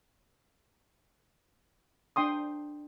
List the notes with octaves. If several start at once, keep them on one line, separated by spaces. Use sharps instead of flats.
D4 G5 C6 D#6